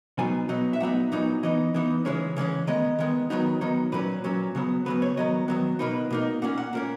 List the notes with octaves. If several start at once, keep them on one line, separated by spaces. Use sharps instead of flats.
B2 F#3 B3 D#4 G#5
B2 F#3 B3 D#4
E5
A#2 F#3 B3 D#4 F#5
A#2 F#3 B3 D#4
E3 B3 D#4 D#5
E3 B3 D#4
C#3 E3 G#3 C#4 C#5
C#3 E3 G#3 C#4
D#3 G#3 B3 D#5
D#3 G#3 B3
D#3 F#3 B3 D#4
D#3 F#3 B3 D#4
A#2 F#3 C#4 B4
A#2 F#3 C#4
C#3 F#3 B3
C#3 F#3 B3 B4
C#5
D#3 F#3 B3 D#5
D#3 F#3 B3
B2 A#3 D#4 B4
B2 A#3 D#4
A#2 A#3 C#4 F#5
F#5
A#2 A#3 C#4